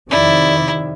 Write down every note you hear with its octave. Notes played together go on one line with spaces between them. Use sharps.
F2 C3 D#3 E4 D5